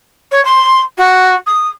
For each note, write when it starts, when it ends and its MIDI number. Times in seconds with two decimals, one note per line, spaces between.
0.31 0.43 73
0.45 0.80 84
0.98 1.35 66
1.46 1.67 87